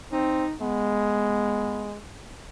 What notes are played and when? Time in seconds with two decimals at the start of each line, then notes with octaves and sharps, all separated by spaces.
0.12 C4 D#4
0.61 G#3 B3